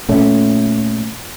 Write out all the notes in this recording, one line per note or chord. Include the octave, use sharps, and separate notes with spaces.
A#2 A3 C#4